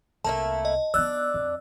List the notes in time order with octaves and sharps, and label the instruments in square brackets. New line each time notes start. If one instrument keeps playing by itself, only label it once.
[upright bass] C2 [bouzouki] A3 A#3 E4 [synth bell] A5
[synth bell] D#5
[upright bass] B3 D#4 [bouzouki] D4 [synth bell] E6 F#6
[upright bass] F2